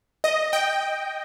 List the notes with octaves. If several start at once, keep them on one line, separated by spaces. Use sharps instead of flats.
D#5
G5